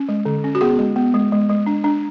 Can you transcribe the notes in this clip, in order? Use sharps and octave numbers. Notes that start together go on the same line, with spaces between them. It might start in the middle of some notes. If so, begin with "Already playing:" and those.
Already playing: C#4
G#3
D3
C#4
F#4
B3 G#4
G#3
B3
G#3
G#3
G#3
D4
D4